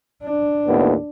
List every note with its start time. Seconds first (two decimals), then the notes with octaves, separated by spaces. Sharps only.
0.23 D4
0.67 D#2 A2 B3